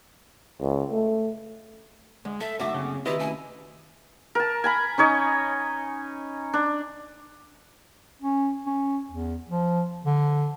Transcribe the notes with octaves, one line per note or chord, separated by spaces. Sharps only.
C#2
A3
D2 G#3
A3 A4 E5
F#2 D3 A3 D#4 F#4 E5 D6
C#3 A#3 C4 C#4
C2 D#3 E4 F#4 G4 B4 D#5
A3 C#4 F#4 G#5
A#4 A5
G#5 A#5 B5
C#4 D#4 C#5 D#5
D4
C#4
C#4
E2
F3
D3